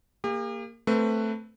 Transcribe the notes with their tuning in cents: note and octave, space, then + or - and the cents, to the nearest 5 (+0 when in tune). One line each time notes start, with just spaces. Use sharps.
A#3 -15 G4 +45
A3 +10 C4 +0 B4 +0